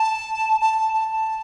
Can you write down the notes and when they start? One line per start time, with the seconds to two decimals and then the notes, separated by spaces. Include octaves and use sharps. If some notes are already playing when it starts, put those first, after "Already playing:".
Already playing: A5
0.61 A5
0.93 A5